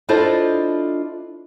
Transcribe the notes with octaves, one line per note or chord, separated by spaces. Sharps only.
D4 E4 F4 A4 C5 D#5